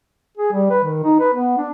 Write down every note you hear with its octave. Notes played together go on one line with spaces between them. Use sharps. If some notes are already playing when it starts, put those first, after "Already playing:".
G#4
G3
B4
D#3
D#4
B4
B3
D4